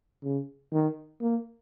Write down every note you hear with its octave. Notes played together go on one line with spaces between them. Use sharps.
C#3
D#3
A#3